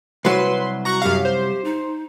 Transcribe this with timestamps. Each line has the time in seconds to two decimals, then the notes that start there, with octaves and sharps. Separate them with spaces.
0.25 C2 F#3 B4 C6
0.85 F#4 A#5 C#6 F#6
1.02 F#2 G4 F5
1.25 C5
1.65 D#4